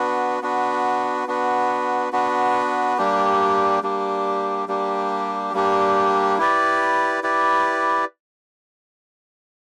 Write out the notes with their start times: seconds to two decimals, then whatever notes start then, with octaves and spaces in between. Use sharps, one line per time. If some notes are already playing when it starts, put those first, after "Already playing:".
Already playing: B3 D4 F#4 B4
0.42 B3 D4 F#4 B4
1.27 B3 D4 F#4 B4
2.12 B3 D4 F#4 B4
2.98 G3 A#3 D4 G4
3.83 G3 A#3 D4 G4
4.68 G3 A#3 D4 G4
5.53 G3 A#3 D4 G4
6.38 E4 G4 B4 D5
7.23 E4 G4 B4 D5